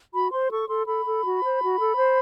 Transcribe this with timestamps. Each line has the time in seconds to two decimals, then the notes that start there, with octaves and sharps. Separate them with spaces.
0.13 F#4 B5
0.32 C5 C6
0.50 A4 C#6
0.68 A4 C6
0.87 A4 B5
1.06 A4
1.24 F#4
1.43 C5
1.61 F#4
1.79 A4
1.98 C5